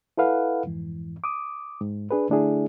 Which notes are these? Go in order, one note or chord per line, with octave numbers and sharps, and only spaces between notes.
E4 A4 B4 F5 F#5
F2 G#2 E3
D6 D#6
G#2
D4 G#4 B4
D3 A3 D4 E4 G#4